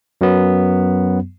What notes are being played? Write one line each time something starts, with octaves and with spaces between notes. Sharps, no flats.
F#2 F#3 B3